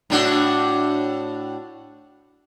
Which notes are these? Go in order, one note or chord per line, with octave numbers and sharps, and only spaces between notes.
A2 D4 F#4